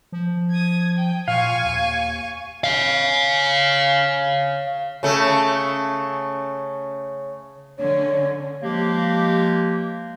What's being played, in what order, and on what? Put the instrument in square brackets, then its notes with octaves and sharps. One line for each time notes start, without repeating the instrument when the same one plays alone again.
[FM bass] F3
[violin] D#6 G#6
G5
[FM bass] A#2 [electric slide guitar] F5 [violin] G#5 C#6
[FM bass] D#2
[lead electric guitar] C#5 F5
[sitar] C#3 A3
[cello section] D3 C#4 [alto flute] C#5
[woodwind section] F3 G#3 A#3 G4